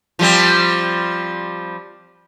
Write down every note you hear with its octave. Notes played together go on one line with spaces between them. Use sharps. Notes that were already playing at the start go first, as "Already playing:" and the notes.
F3 G3 C4